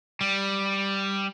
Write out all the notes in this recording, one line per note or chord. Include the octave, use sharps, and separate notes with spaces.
G3